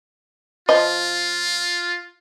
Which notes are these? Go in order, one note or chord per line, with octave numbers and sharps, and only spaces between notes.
F3 F4 D#5